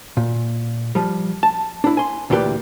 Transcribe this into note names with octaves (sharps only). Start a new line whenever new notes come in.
A#2
F3 G3
A5
D4 E4
G#5 C6
D2 A#2 E3 G4 B4 D5